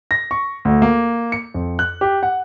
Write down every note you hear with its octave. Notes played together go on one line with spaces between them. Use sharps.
A#6
C#6
D2
A#3
C#7
F2
F#6
G4
F#5